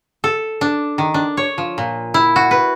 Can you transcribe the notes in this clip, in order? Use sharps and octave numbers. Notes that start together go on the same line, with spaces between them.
A4
D4
D#3
D4
C#5
F3
A#2
E4
F#4
B4